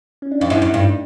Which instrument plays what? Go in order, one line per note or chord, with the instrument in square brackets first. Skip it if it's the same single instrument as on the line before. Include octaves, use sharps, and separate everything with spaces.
[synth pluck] C#4
D4
[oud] F2 [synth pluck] D#4
[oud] F#2 [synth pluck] E4
[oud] F#2 [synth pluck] D#4
[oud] G2
[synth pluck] D4